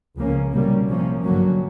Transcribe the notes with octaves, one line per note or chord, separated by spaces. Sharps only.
C#2 C#3 F3 A#3 C#4
C2 B2 G3 A#3 C#4
C3 F3 A#3 C#4
G2 D3 F#3 A#3 C#4